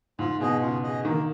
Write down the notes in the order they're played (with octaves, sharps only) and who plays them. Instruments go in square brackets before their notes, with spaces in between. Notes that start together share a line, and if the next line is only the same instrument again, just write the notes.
[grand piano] G#2 [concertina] F4
[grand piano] B2 [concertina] G#4 D#5
[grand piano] C#3 [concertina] F4
[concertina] G#4 D#5
[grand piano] D#3 [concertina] A#3